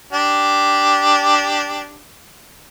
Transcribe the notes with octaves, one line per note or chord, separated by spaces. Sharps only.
D4 G4